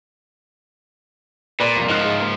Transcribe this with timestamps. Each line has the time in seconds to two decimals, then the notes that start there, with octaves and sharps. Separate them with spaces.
1.60 A#2 B4 D5 B5
1.76 C2 F2
1.89 G#2 F3 D#4 A#4 F#6
2.05 G#3 D#4
2.21 A#3